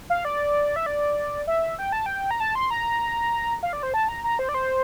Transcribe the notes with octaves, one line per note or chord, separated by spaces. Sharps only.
F5
D5
E5
D5
E5
G5
A5
G5
A#5
A5
C6
A#5
F5
D5
C5
A5
A#5
A#5
C5
D5
C5